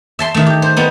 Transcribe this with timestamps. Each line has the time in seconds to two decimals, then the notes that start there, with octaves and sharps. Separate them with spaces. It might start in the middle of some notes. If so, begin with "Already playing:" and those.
0.19 E5 A5 C6
0.34 D#3 A3
0.46 G4
0.62 C5
0.77 G3 B3 D#4